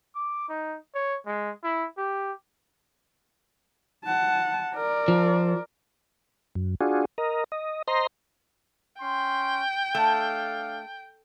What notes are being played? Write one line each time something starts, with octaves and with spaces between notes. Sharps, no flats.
D6
D#4
C#5
G#3
E4
G4
F#5 A5
A#4 D5
F3
F#2
D4 F4 F#4 G#4
A#4 D#5
D#5
C5 D#5 A#5 C6
C#4 G5 C6
A3 D4 A4 F5